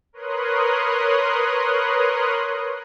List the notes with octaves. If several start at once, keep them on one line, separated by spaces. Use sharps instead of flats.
A#4 B4 C#5 C6 D#6 F#6